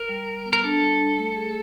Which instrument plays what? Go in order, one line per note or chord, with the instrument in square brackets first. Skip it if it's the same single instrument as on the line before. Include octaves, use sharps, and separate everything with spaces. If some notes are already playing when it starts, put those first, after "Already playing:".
Already playing: [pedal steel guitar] A#4
[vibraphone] G3
G3
B3
[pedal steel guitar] A#4
[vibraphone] D4 [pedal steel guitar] A4
[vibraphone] G3
G3
A3
G#4